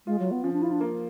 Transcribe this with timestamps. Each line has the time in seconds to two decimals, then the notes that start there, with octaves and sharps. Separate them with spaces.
0.07 G#3 F4
0.19 F#3
0.25 F4
0.31 B3
0.44 F3 C#4
0.53 D4
0.62 E4 F4
0.72 D4
0.80 A#3